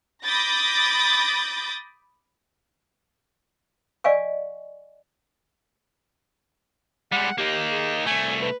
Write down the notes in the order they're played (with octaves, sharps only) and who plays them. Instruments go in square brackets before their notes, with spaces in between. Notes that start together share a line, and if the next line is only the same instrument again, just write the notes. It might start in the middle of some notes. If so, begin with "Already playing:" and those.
[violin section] B5 D6 D#6 G6 A6 A#6
[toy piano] D5 D#5 F5 G#5 C#6
[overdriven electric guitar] G3 G#3 [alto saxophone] F#5
[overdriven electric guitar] A#3 D#4 [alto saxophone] G4
[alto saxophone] G#4
[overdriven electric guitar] C2 A3 [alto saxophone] G#5
[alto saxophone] B4